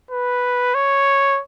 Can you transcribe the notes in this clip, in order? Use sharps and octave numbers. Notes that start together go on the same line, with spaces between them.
B4
C#5